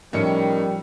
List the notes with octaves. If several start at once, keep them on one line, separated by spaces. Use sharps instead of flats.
A2 D#3 F3 G3 C#4 C#7